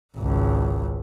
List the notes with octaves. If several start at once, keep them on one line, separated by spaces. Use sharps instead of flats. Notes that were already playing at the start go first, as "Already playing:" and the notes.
G#1 C#2